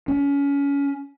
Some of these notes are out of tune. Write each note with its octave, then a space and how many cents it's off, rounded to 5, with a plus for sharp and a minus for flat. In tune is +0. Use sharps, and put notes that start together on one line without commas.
C#4 +25